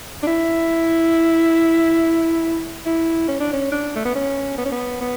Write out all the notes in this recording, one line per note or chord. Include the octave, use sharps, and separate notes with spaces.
D4
E4
E4
C#4
D4
C#4
D4
A3
B3
C#4
B3
C#4
B3
B3